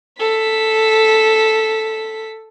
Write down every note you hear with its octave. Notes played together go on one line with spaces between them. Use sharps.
A4 B6